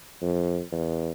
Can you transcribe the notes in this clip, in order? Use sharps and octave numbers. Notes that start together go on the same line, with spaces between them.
F2
E2